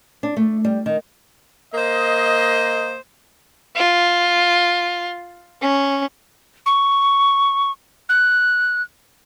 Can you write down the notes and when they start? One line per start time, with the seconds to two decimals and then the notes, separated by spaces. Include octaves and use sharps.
0.23 D4
0.37 A3
0.65 G3
0.86 D#3
1.74 A#3 C5 D#5
3.76 F4
5.62 C#4
6.66 C#6
8.09 F#6